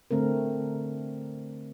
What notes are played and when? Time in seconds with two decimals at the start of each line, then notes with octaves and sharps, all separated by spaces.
0.11 D3 A3 C4 A#4